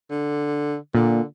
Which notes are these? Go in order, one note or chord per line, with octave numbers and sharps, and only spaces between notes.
D3
A#2 D3